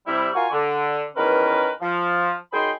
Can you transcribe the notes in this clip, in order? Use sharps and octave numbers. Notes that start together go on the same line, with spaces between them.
C3 G3 E4
F4 F#4 A#4 G#5 C#6
D3
E2 D#3 C#4 A#4 B4
F3
F#2 D#4 G#4 G5 B5 C6